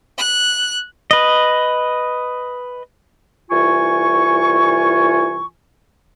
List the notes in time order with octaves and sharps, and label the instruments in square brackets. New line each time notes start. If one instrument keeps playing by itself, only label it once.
[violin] F#6
[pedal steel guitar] B4 D#5
[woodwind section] C2 E3 F4 G#5 C#6